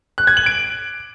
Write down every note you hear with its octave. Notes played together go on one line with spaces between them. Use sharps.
F#6
G#6
F#7
D7